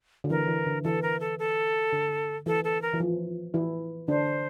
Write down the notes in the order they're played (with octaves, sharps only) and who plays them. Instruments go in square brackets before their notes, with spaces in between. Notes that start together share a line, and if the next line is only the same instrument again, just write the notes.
[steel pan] D3
[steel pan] E3 [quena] A#4
[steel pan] E3
D3
[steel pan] E3 [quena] A4
[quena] A#4
A4
A4
[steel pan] D3
[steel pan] E3 [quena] A4
[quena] A4
A#4
[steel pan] E3
F3
E3 E4
[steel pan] D3 D4 [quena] C5